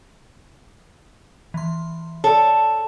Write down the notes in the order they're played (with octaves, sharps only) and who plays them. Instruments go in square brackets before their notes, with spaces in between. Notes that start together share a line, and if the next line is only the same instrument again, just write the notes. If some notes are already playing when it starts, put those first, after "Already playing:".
[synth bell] E3 C6
[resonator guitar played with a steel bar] A4 [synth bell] C#5 D5